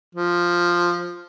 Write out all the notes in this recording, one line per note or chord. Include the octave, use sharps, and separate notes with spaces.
F3